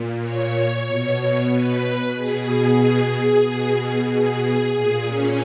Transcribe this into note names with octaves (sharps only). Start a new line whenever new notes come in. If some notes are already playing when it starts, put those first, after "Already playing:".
Already playing: A#2
C#5
B2
B4
B2 G#4
B2
G#4
A#2 G#4
C#4